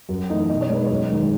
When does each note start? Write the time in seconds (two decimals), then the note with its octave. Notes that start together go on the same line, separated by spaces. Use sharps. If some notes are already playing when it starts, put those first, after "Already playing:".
0.09 F#2
0.29 E3 A3 D#4 D#5
0.50 B2 D#5
0.61 C#5
0.70 G#3 D#4 B4
0.86 F#2 C#5
1.10 D#3 G#3 D#4